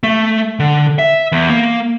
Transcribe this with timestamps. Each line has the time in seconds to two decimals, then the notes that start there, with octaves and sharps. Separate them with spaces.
0.03 A3
0.59 D3
0.99 E5
1.32 E2
1.50 A#3